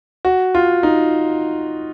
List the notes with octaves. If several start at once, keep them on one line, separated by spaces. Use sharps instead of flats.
F#4
F4
D#4